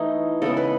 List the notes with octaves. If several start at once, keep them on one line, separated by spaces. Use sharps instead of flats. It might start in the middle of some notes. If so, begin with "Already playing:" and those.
Already playing: E3 A3 D#4
C#3 G#3 B3 A4
B4